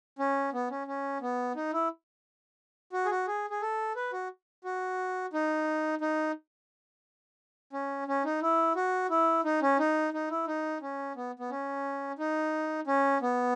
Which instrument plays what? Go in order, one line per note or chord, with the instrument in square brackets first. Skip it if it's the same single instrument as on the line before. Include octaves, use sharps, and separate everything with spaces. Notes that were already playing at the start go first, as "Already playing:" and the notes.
[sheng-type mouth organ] C#4
B3
C#4
C#4
B3
D#4
E4
F#4
G#4
F#4
G#4
G#4
A4
B4
F#4
F#4
D#4
D#4
C#4
C#4
D#4
E4
F#4
E4
D#4
C#4
D#4
D#4
E4
D#4
C#4
B3
B3
C#4
D#4
C#4
B3